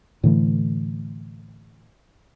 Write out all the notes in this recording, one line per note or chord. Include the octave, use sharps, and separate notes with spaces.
A2 D3 E3 A3